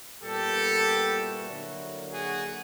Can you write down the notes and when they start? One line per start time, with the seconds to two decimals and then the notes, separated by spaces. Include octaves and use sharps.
0.22 A#2 G3 B3 G4 A4
1.17 E4 F#4
1.49 D3 F#3 A#3
2.11 F#4 G#4